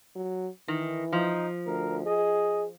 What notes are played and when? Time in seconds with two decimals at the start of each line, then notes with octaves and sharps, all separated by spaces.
0.15 F#3
0.68 D#3 E3
1.13 F3 D#4
1.66 D2 A#4
2.05 G#4 D#5